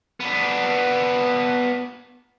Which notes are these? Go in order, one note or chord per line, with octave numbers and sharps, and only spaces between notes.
B3 D4